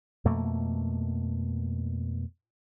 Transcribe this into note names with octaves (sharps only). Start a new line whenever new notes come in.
F2 B2 A3 A#3